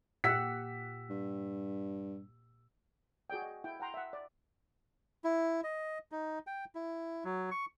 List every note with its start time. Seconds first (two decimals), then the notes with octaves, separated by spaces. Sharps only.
0.24 A#2 G4 F#5 E6 B6
1.10 G2
3.30 F#4 G#4 D5 G5
3.42 D#5
3.64 E4 G5
3.80 F#5 G5 A#5 C6
3.94 E5 F#5
4.13 D5
5.24 E4
5.64 D#5
6.12 D#4
6.47 G5
6.75 E4
7.25 F#3
7.51 C#6